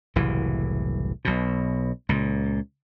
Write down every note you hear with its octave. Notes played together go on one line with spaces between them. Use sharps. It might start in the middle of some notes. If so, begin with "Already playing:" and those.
F#1 C2 A2 E3
B1 B2
C#2 A#2